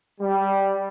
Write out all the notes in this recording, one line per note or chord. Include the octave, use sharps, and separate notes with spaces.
G3